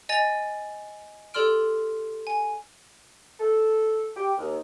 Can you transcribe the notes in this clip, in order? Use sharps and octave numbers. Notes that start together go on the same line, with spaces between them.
D#5 G#5 A6 F7
G4 A4 D5 C6 F6 D7
G#5
A4
G4
D#2